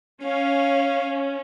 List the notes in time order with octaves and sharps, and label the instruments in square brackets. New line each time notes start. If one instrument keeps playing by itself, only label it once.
[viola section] C#4 [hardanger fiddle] F5